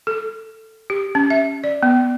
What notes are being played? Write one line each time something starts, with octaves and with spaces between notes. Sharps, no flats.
A4
G4
C#4
E5
D5
B3